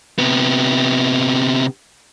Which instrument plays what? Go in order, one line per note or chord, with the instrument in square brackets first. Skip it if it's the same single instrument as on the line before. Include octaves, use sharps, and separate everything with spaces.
[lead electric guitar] C3 B3